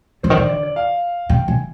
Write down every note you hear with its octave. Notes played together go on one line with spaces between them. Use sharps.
D3 C5
D#3
D3 D5
D5
D5
F5
C3 G5
C3 G#5